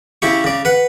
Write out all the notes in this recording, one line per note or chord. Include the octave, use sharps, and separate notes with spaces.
C#3 E4 G4 C#6
C#3 D5
B4 F#5